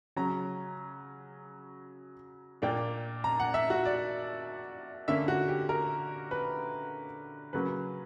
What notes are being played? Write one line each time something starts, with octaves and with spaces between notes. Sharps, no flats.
C#3 F#3 C#4 A#5
A#2 A#3 D4 G5
A#5
F#5
E5
F#4
D5
D3 A#3 C#4 E5
F#4
G4
A#4
B4
C#3 F#3 A#3 C#4 B4